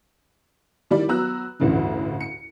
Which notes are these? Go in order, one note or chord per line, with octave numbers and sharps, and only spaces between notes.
D#3 G3 E4 D5
F#3 B3 F#4 A#5 E6 F#6
A1 D2 G2 C#3 E3
C#7